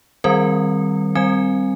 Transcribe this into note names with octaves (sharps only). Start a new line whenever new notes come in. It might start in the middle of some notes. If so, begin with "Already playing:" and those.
D#3 G3 C4 A#4
G3 C4 G#5